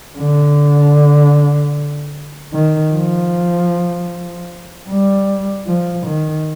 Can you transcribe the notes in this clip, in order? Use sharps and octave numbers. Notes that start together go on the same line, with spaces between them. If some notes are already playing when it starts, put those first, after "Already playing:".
D3
D#3
F3
G3
F3
D#3